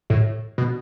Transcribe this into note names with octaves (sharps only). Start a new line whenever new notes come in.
A2
B2